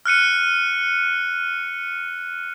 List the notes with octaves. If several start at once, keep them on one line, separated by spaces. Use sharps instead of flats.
F6 F#6 C#7 D#7